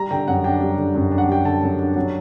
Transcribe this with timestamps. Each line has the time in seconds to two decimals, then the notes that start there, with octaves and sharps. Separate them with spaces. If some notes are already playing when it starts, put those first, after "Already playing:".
Already playing: G3 A#5
0.11 D3 G5
0.27 F#2 F#5
0.44 D4 G5
0.61 G3
0.78 D3
0.95 F#2
1.12 D4
1.18 F#5
1.28 G3 G5
1.45 D3 A5
1.62 F#2
1.79 D4
1.96 F#3